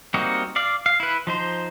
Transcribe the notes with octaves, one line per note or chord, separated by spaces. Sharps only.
G3 A#3 C4 D#4 F#4
D5 F5
F5
E4 B4
F3 D#4 C5